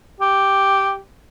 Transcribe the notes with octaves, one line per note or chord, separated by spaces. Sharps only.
G4